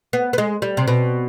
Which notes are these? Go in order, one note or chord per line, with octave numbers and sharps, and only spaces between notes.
B3
B3
G#3
G3
C3
B2